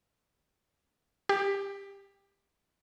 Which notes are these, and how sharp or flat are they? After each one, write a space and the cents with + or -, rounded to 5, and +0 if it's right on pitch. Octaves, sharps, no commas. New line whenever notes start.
G4 +15